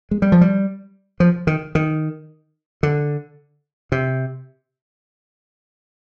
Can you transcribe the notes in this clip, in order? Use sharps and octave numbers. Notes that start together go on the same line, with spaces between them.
G#3
G3
F3
G3
F3
D#3
D#3
D3
C3